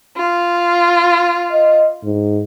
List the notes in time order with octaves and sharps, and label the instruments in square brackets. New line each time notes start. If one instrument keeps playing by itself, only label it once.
[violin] F4
[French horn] D#5
G#2